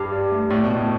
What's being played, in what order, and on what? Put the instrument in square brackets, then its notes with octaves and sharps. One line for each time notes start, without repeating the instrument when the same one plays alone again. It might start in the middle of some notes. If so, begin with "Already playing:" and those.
Already playing: [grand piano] G2 [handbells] G4
[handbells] D5
A3
[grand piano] A2 [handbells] D5
[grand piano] B2
[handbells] A5
[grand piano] A2